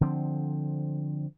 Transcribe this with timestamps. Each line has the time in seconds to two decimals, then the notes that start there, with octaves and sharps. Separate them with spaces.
0.01 D3 F3 C4